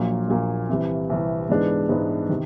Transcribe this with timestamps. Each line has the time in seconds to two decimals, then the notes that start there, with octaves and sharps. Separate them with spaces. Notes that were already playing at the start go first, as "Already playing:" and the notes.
Already playing: A#1 A#2 F#3 A#3
0.28 A#1 A#2 F#3 A#3
0.69 C2 C3 E3
1.10 C2 C3 E3
1.49 G#2 E3 G#3 B3 D4
1.89 G#2 E3 G#3 B3 D4
2.29 C3 D#3